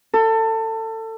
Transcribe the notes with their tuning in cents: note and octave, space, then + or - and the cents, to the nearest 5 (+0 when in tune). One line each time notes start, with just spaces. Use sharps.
A4 +25